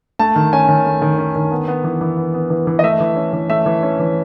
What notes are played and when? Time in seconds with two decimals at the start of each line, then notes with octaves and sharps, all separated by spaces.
0.19 A3 A5
0.36 D#3
0.53 C#4 G#5
0.69 D#3
0.85 A3
1.02 D#3
1.18 C#4
1.35 D#3
1.52 B3
1.68 B3
1.84 E3
2.01 E3
2.17 B3
2.34 B3
2.50 E3
2.67 E3
2.79 D#5
2.83 A3 E5
3.00 E3
3.16 C#4
3.33 E3
3.50 A3 E5
3.66 E3
3.83 C#4
4.00 E3